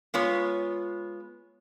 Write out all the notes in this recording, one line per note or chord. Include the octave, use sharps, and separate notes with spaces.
G#3 B3 F4 C#5